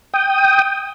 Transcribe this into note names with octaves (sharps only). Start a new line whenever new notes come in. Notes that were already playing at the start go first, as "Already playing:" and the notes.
G5 D#6